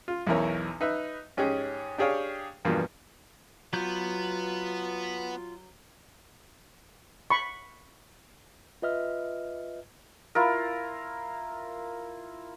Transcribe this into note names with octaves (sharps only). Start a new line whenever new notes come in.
F4
B1 E2 E4 A#4 C#5
D#4 B4 E5
G#2 C#4 G4 G#4 D#5
D4 G4 G#4 C#5 F5 G5
E2 G2 B2 F3 A#3
F#3 B3 F4 G6
B5 C#6
F4 B4 D#5 E5 F6
E4 F4 A#4